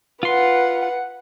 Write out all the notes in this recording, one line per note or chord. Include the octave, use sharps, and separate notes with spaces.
F4 B4 F#5 C6